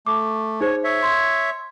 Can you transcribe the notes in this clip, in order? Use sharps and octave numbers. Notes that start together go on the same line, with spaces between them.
A3 D6
D#4 G#4 C5 C#5
C#5 E5
C6 G#6